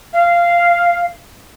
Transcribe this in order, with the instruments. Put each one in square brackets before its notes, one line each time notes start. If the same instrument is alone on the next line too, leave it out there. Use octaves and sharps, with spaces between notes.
[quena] F5